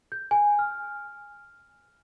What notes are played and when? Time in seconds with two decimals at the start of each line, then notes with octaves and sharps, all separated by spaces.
0.12 G6
0.31 G#5
0.59 F6